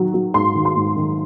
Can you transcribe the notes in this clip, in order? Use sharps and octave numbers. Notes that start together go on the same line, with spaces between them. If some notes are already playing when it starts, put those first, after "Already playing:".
Already playing: D#3 F#3
F#3
G#2 C6
D#3
C6
G#2
D#3